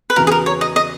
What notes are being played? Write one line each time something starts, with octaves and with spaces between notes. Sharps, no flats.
B4
E2 C#3 E3 B3 F#4 A#4
G#4
A#4
C#5
D#5
D#5